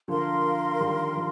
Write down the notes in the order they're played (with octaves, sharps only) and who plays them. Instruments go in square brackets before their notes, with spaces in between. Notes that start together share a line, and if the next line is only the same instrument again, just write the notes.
[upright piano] D3 F3 [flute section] A#4 F5 C6
[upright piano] D#3 G3
F3